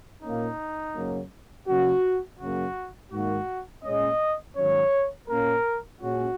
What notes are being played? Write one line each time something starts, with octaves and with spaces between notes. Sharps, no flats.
A#2 A#3 C#4 D#4
F#2 C#3 F#3 A#3 C#4
C#3 F#3 A#3 C#4 F#4
F#2 C#3 F#3 A#3 F#4
G#2 D#3 A#3 F#4
A#2 G#3 C#4 D#5
G#2 D#3 F#3 C#4 C#5
A#2 A#3 C#4 A#4
A#2 G#3 C#4 F#4